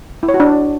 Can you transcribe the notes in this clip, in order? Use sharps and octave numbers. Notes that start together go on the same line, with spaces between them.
E4
C#5
F#4
D4